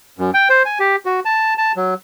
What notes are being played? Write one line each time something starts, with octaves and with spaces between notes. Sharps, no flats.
F#2
G5
C5
G#5
G4
F#4
A5
A5
F#3